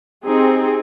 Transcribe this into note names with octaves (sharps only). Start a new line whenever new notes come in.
C4 D#4 G4 G#4